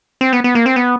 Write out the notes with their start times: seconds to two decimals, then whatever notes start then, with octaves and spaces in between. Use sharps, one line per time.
0.21 C4
0.33 B3
0.44 B3
0.55 A#3
0.66 C4
0.76 B3